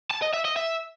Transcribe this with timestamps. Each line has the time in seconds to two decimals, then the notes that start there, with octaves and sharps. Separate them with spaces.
0.11 A5
0.22 D#5
0.34 E5
0.45 D#5
0.56 E5